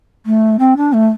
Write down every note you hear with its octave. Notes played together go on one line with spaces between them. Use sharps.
A3
C4
D4
A3